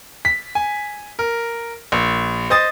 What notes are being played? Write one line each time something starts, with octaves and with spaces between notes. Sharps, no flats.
B6
G#5
A#4
A#1
C5 D#5 D#6 A6